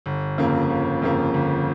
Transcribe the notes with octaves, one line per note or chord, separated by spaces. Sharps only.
G1
F2 C#3 F3 A#3
G1
F2 C#3 F3 A#3
G1